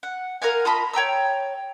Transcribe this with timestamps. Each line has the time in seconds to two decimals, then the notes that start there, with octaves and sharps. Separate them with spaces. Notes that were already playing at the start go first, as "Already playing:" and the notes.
0.03 F#5
0.42 A#4 F5 F#5 G#5
0.65 F4 D#5 A5 B5
0.93 C#5 G5 A#5 E6